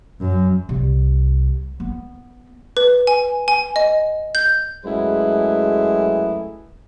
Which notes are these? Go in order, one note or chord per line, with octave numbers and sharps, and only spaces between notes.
F#2
C2
B3
B4
G#5
G#5
D#5
G6
F#2 G#3 A3 E4 G#4 B4